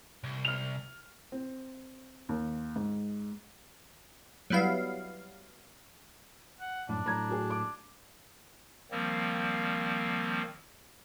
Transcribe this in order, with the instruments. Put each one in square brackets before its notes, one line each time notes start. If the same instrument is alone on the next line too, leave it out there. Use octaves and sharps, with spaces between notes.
[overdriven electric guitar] C2
[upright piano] F6 F7
[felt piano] C4
D#2
G#2
[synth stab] F#3 G3 B3 E4 F5
[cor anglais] F#5
[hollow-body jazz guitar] F#2 A2 [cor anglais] D4
[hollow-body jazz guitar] A2 F#3 [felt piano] A#5 G#6
[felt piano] F#4 G#4
D6
[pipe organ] D#3 F3 G3 A#3 C4